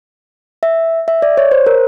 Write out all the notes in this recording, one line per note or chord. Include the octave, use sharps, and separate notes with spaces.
E5
E5
D5
C#5
C5
A#4